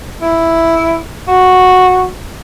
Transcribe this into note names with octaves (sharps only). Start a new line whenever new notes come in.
E4
F#4